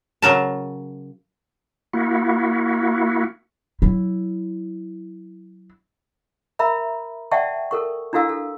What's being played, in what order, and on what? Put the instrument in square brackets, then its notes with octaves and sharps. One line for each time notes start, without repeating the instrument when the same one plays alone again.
[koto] C#3 F#3 A#4 A5
[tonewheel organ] A#3 E4 F#4
[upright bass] F#3 E4
[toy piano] A#4 E5 A#5 B5
D5 E5 F#5 G5 A5 C#6
A4 A#4 C#6
D4 E4 F#4 A4 F5 E6
A4